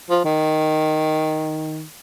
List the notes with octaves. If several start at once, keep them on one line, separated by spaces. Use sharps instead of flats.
F3
D#3